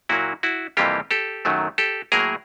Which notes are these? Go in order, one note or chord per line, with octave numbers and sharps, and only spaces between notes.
A#2 F#3 A#3 E4 F#4
E4 F#4
F2 C3 E3 G3 A#3 F4 G4
G4 A4
F#2 D#3 F#3 A3
G4 A4
A2 F#3 A#3 G#4 A#4